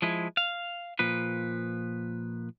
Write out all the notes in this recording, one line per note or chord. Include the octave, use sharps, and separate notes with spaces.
F3 G#3 E4
F5
A#2 F3 B4